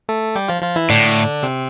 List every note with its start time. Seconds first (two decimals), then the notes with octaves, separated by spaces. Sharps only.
0.09 A3 A4
0.35 G3 G4
0.48 F3 F4
0.62 F3 F4
0.76 E3 E4
0.89 A2 D3 D4
1.43 C3 C4